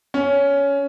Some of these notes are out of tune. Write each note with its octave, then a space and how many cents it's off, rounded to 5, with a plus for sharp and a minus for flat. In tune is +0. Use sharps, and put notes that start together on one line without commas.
C#4 +15